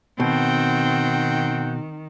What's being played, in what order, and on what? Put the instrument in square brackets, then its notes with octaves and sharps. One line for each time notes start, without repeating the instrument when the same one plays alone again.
[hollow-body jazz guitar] B2 [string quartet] D#3 [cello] C4 [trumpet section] F#5 G5